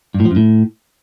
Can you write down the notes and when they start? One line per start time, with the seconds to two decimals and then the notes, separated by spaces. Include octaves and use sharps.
0.14 G2
0.20 A2
0.25 F3
0.31 F#2
0.36 A2